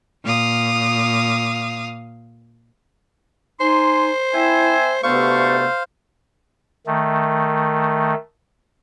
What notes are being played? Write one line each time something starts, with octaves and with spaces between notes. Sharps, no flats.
A#2 F5 D#6
D#4 C5 G#5 C6
C4 E4 E5 G#5
D2 C3 A3 B3 C5 F5 C#6
D#3 A3